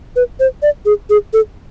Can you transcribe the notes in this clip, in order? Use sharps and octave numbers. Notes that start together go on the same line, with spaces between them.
B4
C5
D5
G#4
G#4
A4